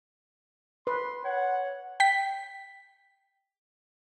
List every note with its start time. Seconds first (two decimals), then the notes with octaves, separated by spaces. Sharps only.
0.87 B4 C6
1.25 C#5 F#5
2.00 G5 B6